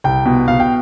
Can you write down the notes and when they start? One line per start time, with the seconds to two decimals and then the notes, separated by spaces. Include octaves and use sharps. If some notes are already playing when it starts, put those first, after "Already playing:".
0.04 C2 G5
0.26 B2
0.48 B2 F5
0.60 G5